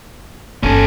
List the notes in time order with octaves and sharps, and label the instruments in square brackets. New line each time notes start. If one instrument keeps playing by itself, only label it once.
[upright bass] G1 [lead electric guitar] C#4 A4